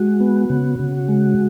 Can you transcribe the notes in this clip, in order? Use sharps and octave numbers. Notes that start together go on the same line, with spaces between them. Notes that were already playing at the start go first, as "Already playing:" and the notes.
Already playing: G#3 F#4
B3
C#3
C#3
G#3